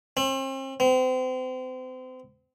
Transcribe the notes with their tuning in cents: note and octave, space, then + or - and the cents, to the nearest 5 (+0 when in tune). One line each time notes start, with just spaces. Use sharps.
C4 +40
C4 -35